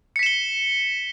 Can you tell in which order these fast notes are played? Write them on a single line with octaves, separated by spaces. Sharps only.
C#7 B6 E7 G7